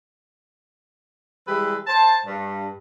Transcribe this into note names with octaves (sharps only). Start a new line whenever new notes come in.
E3 G3 G#3 G4 A4 B4
C5 A5
G2